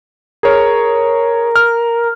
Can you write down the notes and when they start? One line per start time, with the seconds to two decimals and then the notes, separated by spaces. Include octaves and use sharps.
0.43 G#4 A#4 C#5
1.56 F6